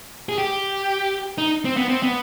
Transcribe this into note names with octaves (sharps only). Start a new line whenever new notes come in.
G#4
G4
D#4
C4
B3
C4
B3